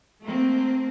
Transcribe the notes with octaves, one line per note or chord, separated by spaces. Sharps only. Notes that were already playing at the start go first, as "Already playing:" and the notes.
A3 A#3 C4